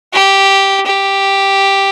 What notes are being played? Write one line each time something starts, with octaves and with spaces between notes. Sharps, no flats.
G4
G4